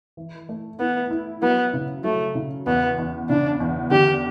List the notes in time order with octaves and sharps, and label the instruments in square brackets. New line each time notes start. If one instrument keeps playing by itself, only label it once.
[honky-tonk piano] E3
A3
[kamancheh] B3 [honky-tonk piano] E4
[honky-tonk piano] E4
[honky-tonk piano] F#3 [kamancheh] B3
[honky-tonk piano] C#3
[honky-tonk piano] F#3 [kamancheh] A3
[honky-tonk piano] C#3
[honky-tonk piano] E2 [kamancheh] B3
[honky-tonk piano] E2
[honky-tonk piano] C#3 [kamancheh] D4
[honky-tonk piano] E2
[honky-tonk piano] D3 [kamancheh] G4